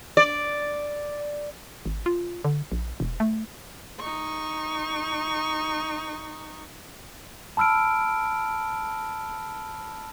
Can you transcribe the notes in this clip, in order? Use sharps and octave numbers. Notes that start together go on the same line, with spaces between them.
D5
G#1
F4
D3
A#1
E1
A3
D#4 C#6
A5 B5 E6 F6 D7